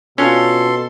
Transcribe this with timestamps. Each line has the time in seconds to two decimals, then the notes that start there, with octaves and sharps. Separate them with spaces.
0.18 B2 C#4 D4 F4 F#4 A4 C6